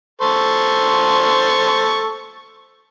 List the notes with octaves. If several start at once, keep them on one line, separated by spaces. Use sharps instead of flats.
A4 C5 C#6